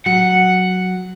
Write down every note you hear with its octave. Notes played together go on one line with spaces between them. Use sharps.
F#3 F#5